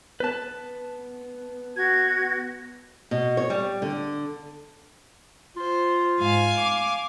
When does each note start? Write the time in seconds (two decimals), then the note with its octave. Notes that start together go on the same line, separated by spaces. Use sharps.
0.20 B3 B4 A5
1.76 F#4 G#6
3.11 B2
3.37 C#5
3.50 G3
3.82 D3
5.56 F4 C5
6.20 G#2 F5 G#5
6.59 D6